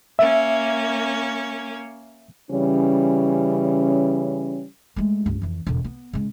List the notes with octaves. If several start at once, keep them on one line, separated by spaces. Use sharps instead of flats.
A#3 C#4 E5
C#3 E3 G3 C#4
G#3 A3
C#2 G2
F2 E3
E1 D3
B3
C#3 G#3